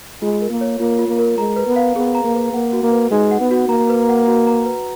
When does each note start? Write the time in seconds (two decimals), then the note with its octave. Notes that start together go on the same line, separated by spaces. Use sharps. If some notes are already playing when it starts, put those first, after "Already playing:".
0.22 G#3 F4
0.41 A#4
0.50 A#3
0.61 C#5
0.80 A#3 F4
0.99 F4
1.09 A#3
1.18 A#4
1.38 G#3 A#5
1.56 B4
1.67 B3
1.76 F5
1.95 B3 G#4
2.15 A#5
2.25 A#3
2.35 B4
2.53 A#3 F#5
2.73 F#4
2.83 A#3
2.92 B4
3.11 G#3 D#4
3.31 F#5
3.40 B3
3.51 F#4
3.69 A#3 A#5
3.89 B4
4.09 F#5
4.28 F#4
4.47 A#5
4.66 B4